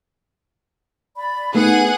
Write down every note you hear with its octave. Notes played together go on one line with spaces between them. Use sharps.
D5 B5
A3 B3 D#4 G#4 F#5 G#5 F#6